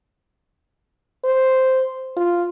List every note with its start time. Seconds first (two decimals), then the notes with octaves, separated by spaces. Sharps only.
1.24 C5
2.17 F4